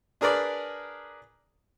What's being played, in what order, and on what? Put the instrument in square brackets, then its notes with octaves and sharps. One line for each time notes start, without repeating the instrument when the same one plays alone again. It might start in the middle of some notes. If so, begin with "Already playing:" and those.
[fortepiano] D4 G#4 A#4 B4 D5